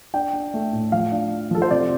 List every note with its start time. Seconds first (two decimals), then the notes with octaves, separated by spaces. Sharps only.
0.14 D4 G5
0.33 D4
0.54 A3
0.73 A2
0.92 F3 F5
1.12 D4
1.32 D4
1.51 F3 A4
1.62 C5
1.70 C3 D5